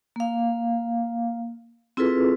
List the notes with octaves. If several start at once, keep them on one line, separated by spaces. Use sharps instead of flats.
A#3 F5
C4 E4 F4 G#4 A4 B4